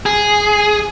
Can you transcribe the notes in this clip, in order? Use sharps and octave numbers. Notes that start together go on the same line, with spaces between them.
G#4